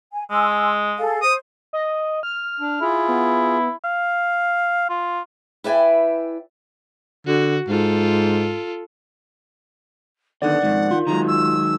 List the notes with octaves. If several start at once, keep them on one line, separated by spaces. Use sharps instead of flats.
G#5
G#3 G#5 C6 E6
G#4 A4 F5
C5 D#6
D#5
F6
D4
E4 F4 G#4
B3
F5
F4
E4 B4 D5 E5 G5 G#5
D3 F#4
G#2 F4 A4
D3 D#3 B3 D5 F#5
F2 G#2 D#3
D#3 F4
D#3 F#3 G#3 A#5
E6